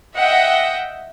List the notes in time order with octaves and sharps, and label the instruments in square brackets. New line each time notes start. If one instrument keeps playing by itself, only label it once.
[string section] D#5 E5 F#5 G5